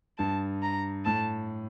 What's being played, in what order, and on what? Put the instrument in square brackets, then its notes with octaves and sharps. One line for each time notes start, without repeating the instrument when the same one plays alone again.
[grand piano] G2 [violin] A5
[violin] A#5
[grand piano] A2 [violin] A5